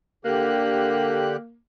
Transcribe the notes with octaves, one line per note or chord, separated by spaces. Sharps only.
D3 A#3 G4 F#6